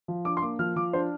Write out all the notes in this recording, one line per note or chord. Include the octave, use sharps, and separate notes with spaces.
F3
D4 D6
C6
A#3 D6
F3 F6
F3 D6
D4 C5